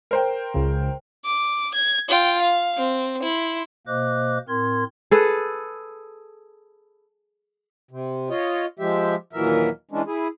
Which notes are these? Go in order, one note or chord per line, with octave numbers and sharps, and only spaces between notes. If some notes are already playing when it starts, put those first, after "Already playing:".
A#4 C5 G5
C#2 C#3
D6
G#6
F4 G5
F5
C4
E4 C6
B2 A#3 C5 D#5 D6 F#6
A2 C4 A#4 C6 G#6
G#4 A4 B4
C3
F4 C#5 D#5
F3 G#3 G4 E5
D#2 A#2 E3 F#3 A#4 E5
E3 G#3 C#4 D4
E4 G#4